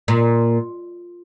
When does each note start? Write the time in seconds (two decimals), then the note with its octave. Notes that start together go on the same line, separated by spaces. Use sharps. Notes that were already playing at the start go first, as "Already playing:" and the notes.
0.08 A#2